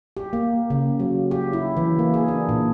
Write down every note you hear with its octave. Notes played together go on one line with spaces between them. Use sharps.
G4
A#3
C#3
F#3
G4
E4
E3
A#3
G#4
D4
A#2